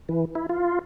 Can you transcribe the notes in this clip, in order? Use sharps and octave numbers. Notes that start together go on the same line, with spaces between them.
E3
E4
F4